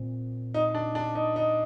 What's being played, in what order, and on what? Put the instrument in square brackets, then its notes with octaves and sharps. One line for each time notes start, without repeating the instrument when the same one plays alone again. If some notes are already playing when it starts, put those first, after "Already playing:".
Already playing: [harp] A#2 C4
[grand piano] D#4
D4
D4
D#4
D#4